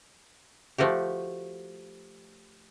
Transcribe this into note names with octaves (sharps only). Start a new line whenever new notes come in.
F3 A3 F#4 G4